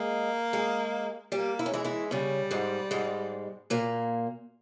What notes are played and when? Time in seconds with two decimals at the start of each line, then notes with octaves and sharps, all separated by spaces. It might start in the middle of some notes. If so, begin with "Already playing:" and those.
Already playing: G#3 A#3 G#4
0.53 G#3 G#4
1.32 G3 A#3 G4
1.59 E4
1.66 C#4
1.71 E3 G#3 E4
1.84 E3 E4
2.11 C#3 G3 C#4
2.51 G#2 G#3
2.91 G#2 G#3
3.70 A#2 A#3